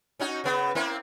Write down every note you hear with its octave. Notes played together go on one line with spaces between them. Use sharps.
C#4 D#4 F#4
C#3 B3
A#3 C4 E4